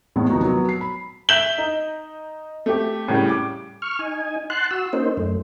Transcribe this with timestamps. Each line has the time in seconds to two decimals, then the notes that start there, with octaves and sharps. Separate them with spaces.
0.16 E2 A2 G#3 B3
0.30 D#2 C3 F3 B3 D#4 F#4
0.43 F#3 B3
0.69 C7
0.81 B5
1.29 E5 G6 E7 G7
1.58 D#4
2.66 A3 G4
3.08 A2 C#3 G3
3.29 D6
3.82 C#6 F6
3.99 D#4 G#5
4.50 F#5 A5 C6 F#6
4.71 F#4 E6
4.93 A#3 C#4 D#4 C5
5.17 F#2 A3